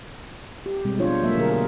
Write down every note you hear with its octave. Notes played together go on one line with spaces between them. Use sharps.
G4
B2 G3 G#3 C4
F3 D4 F4 C5 C#5
F#3 A3 A#3 E5
B2 D3 F#3 G#4 A#4
A#4